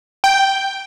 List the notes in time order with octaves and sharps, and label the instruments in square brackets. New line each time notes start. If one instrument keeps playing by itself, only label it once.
[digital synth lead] G5